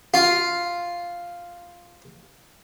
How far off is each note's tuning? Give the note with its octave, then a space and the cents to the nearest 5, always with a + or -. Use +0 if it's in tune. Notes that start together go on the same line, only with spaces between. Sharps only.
F4 +0